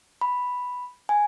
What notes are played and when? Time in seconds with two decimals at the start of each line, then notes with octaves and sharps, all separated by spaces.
0.21 B5
1.09 G#5